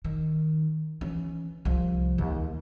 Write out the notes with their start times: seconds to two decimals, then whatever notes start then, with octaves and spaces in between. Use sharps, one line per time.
0.04 D#3
1.01 E3 C#4
1.65 C2 F3
2.18 D#2